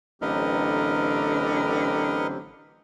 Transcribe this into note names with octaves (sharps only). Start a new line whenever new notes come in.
A1 D3 F#3 C4 G4 A#4 B4 D#5